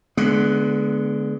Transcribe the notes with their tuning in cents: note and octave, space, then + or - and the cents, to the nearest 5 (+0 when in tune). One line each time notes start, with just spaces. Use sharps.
D3 +0 G#3 +30 B3 +0